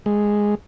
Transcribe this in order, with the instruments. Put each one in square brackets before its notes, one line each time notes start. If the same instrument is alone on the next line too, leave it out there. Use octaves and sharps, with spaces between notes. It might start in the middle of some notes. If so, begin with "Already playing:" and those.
[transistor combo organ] G#3